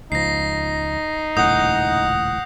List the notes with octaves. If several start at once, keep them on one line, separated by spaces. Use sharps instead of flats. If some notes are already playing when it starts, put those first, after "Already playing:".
C#2 F3 D#4 A#6 C7
D#1 C#2 A2 F#5 D#6 G6